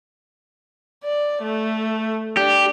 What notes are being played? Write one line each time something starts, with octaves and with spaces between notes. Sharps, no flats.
D5
A3
D4 G4